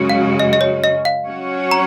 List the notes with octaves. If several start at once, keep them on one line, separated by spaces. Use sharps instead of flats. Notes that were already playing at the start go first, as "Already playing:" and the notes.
Already playing: F#2 C#3 G#3 C#4 F#4
F5
D#5
D#5
C#5
D#5
F5
F#3 C#4 F#4 C#5
A#5